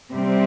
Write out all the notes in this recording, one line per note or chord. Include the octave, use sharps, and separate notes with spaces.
C3 G3 C4